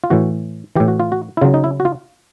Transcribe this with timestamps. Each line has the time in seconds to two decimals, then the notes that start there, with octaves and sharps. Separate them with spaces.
0.04 F4
0.10 A2 E3 F#4
0.76 A2 E3 G4
0.88 F#4
1.00 F4
1.12 F#4
1.37 E4
1.41 C#3 F4
1.45 F#3
1.54 D#4
1.64 E4
1.80 F#4
1.85 F4